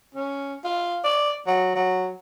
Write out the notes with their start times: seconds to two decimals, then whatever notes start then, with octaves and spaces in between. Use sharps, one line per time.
0.15 C#4
0.64 F4
1.04 D5
1.47 F#3
1.75 F#3